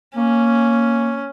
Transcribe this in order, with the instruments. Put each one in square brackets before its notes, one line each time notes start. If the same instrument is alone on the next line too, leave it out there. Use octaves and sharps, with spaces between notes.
[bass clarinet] A#3 [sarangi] C#4